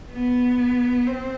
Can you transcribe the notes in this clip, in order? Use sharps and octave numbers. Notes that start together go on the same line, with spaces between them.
B3
C4